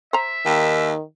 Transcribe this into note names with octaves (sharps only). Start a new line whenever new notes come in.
C5 E5 A#5
D#2 D#3